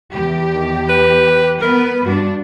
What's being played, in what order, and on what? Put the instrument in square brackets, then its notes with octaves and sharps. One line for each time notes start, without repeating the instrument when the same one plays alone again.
[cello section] E2 G4
[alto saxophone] D#3
B4
[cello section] B3 B4 [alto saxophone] A#4
[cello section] G2 D4 [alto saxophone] F#4